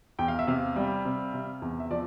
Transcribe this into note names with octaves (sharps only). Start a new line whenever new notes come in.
E2 G5
F5
E5
C3 F5
G3
C3
C3
E2
E5
F3 D5